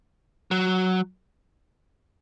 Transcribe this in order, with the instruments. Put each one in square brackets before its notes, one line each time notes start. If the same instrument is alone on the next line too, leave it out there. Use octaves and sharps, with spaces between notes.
[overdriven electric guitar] F#3